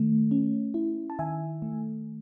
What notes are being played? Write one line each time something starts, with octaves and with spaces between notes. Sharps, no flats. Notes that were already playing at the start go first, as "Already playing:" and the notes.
Already playing: D#3 A3
C#4
E4
A5
D#3 E5 G#5
A3